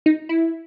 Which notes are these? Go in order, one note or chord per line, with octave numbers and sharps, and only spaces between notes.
D#4
E4